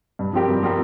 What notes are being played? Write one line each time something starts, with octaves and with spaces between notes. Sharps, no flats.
G2
F3 C4 G4 A#4
G2
F3 C4 G4 A#4